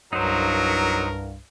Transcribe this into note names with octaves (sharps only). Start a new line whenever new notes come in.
C2 G2 F#3 D#4 A#4 C5